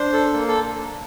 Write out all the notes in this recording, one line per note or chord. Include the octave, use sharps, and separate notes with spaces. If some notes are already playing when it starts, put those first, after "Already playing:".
Already playing: D4 C5
A4
A#3
A4